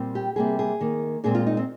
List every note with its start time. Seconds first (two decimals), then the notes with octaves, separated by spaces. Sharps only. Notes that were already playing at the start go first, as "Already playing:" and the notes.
Already playing: A#2 G3 C4
0.15 G4
0.36 C3 G3 A#3 G#4
0.59 G#4
0.81 D#3 A#3
1.24 A#2 G#3 C4 G#4
1.35 F4
1.47 D#4
1.57 C4